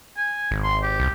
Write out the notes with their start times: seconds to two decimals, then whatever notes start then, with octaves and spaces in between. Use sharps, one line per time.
0.17 G#5
0.51 G#1
0.64 C6
0.82 G4
1.00 C2